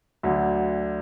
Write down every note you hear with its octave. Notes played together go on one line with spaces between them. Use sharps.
D2 D3 F#3